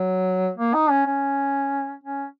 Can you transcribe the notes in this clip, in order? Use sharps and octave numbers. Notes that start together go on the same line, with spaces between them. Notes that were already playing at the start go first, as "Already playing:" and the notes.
Already playing: F#3
A#3
D#4
C#4
C#4
C#4